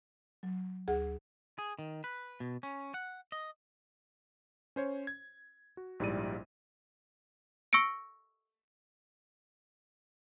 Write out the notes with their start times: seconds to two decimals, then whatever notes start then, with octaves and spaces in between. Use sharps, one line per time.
0.43 F#3
0.88 D2 G#4 F#5
1.59 G#4
1.79 D#3
2.04 B4
2.40 B2
2.63 C#4
2.94 F#5
3.32 D#5
4.76 C#4 C5 C#5
5.07 G#6
5.77 F#4
6.00 A#1 G#2 G3 E4 D5 D#7
7.73 C#6 E6 A#6 C#7 D7